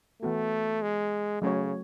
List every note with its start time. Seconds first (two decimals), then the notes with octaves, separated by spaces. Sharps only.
0.22 E3 A3 B3 F#4
0.82 G#3
1.42 C#3 F#3 A3 C#4 F#4 C#5